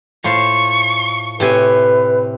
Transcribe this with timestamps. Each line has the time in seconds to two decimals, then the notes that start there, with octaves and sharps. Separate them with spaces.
0.24 A2 F4 C5 C#6
1.40 A2 C3 B4 G#5